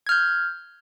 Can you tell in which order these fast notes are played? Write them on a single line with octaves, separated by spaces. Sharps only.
G#6 F6 G6